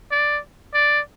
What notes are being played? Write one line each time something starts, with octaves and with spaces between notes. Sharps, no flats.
D5
D5